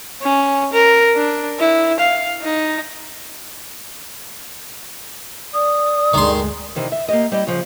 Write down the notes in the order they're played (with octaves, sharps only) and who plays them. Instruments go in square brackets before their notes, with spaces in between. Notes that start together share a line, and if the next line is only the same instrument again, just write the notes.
[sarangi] C#4
A#4
D4
E4
F5
D#4
[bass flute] D5 [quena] D#6
[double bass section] D2 G2 G#3 [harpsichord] D#3 C6
[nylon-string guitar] C3 D#3 E3
E5
A#3 G4 D#5
G3 E4 G4 D#5
C#3 F3